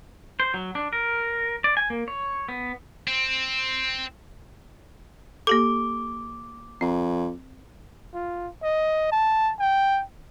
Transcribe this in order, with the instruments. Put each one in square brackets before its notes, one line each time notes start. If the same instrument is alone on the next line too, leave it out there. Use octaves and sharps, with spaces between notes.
[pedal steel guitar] C5
F#3
D4
A#4
D5
G#5
A#3
C#5
B3
[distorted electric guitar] C4
[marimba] A#3 G4 A4 [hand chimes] D6
[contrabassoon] F2 [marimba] C4
[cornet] F4
D#5
A5
G5